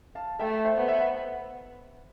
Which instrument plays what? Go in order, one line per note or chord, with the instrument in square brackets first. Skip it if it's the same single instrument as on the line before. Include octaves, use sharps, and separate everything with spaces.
[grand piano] F5 A5
[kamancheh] A3 [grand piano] E5 G5
[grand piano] C5 E5
[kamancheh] B3
[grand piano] C5 E5